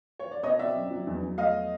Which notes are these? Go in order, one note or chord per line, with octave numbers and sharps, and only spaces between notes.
C#5
D5
B2 C#5 D#5
C4 D5 E5
F#2
F#3
E2
E2
A3 D#5 F5